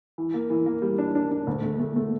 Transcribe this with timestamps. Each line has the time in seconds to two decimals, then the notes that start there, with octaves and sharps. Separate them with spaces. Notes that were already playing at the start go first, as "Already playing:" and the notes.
0.18 E3
0.34 A#3
0.50 E3
0.66 A#3
0.82 G3
0.98 D4
1.15 D4
1.31 D4
1.47 D2
1.63 A3
1.80 A3
1.96 A3